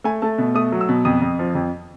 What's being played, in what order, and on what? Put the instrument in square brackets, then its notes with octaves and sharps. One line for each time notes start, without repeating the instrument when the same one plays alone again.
[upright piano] A3 G#5
A3 A5
B2
A3 D#6
F#3
E6
B2
F2 D#6
F2
F3
F2